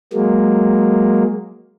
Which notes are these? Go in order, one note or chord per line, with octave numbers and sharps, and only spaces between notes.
F#3 G#3 A#3